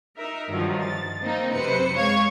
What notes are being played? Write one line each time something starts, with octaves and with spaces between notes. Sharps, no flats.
D#4 A#4 E5
G2 D3 D#3 F3 F#3
A6
A#3 C4 D#4
F#2 C3 B4 C5 C#7
G#3 C#5 F5 C#6 G#6